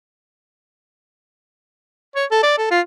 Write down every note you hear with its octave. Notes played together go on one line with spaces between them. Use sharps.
C#5
A4
D5
A4
F4